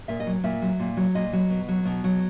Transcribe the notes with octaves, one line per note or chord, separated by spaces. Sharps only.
A#2 E5
D#5
F#3
A#2 E5
F#3
A#2
F#3
A#2 D#5
F#3
B2
F#3
B2
F#3